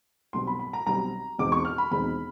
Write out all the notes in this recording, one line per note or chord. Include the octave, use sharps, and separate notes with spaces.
B1 B2 G3 C4 C6
B5
B5
A#5
B1 B2 G3 C4 A#5
E2 B2 G#3 C4 D#4 D6
C#6
F6
B5
E2 B2 G#3 C4 D#4 B5